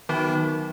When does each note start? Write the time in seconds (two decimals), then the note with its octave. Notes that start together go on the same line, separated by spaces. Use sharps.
0.09 D#3 F#3 B3 D#4 F#4